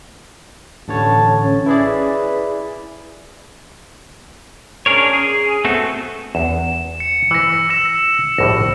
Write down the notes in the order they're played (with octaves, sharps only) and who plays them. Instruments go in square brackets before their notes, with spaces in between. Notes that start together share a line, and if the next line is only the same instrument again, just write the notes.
[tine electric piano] A1 D3 C#5 [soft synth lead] A5
[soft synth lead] C#4
[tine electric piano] E4 G#4 D5 [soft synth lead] B4
[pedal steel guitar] C#4 D4 G#4 A#4 C#5
G#4
A3 B3 C4 F#4 A4
[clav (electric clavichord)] E2 [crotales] E7
[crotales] C#7
[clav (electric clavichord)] E3 B4 [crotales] E6 A#6
[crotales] E6 A#6 E7
[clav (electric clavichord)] A#1 A2 G3 [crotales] A#6